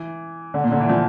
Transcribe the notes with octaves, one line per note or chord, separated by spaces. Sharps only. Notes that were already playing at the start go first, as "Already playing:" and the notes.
Already playing: E3
D3
A#2
D3
E3
F3